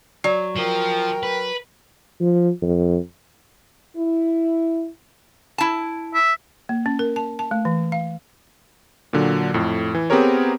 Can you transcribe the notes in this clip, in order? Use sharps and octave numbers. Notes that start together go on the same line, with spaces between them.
F#3 D5
F3 A#4 G5
B4
F3
F2
E4
E4 A5
E5
A#3
C#4
A#4
A5
A5
A3
E3
F5
A#2 D3 F#3
F2 A2
E3
B3 C4 G4 G#4 A#4 C#5